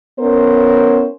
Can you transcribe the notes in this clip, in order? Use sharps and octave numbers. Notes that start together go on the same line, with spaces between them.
B3 C#4 E4 A#4 C5